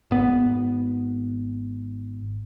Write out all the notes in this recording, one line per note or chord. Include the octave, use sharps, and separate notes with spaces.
G#1 B3